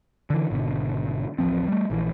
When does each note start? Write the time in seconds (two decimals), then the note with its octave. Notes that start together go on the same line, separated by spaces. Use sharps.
0.30 D3 E3
0.50 G#1 B2 D3
1.38 D1 A1 F3 C4
1.68 G3 A3
1.90 A#1 E3